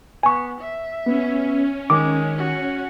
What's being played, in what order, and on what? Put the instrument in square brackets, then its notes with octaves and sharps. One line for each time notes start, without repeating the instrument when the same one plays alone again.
[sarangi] B3 [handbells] G#5 C#6
[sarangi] E5
[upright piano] B3 [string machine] C#4
[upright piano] D#3 [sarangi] G#3 [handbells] D6
[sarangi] F#4